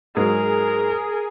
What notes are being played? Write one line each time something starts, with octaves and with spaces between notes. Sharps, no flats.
G#2 F#3 G#4 A#4